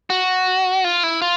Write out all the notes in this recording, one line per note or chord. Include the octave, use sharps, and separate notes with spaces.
F#4
F4
E4
F4